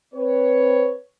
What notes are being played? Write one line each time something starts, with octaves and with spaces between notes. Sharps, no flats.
C4 B4 C#5